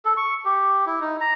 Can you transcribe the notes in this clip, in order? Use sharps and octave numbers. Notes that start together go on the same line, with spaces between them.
A4
C#6
G4
E4
D#4
A#5